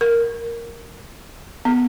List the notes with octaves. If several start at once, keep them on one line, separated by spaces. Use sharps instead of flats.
A#4
B3